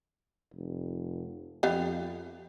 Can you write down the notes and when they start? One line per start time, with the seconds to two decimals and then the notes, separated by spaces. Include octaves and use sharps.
0.54 F1
1.63 F2 B3 G4 F5